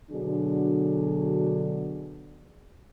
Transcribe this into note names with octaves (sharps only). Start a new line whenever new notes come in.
B2 D3 F#3 D4 F#4 G#4